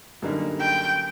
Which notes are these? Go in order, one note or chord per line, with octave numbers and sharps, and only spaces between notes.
F#2 D3 G3 A#3 D#4
G5